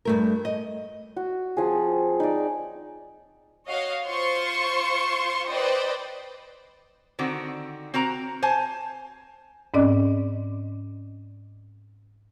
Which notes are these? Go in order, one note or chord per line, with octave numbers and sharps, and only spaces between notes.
G2 A3 A#4
D#5
F#4
F3 C4 G#4
D#4 D5
F#4 C#5 D#5 F5
F4 C5 C6 C#6
B4 C5 D5 D#5 G5
D3 D#3 C4 F#4
C4 F#4 A#4 A#5
C5 G#5 A5
G#2 C4 C#4 D5 D#5 D6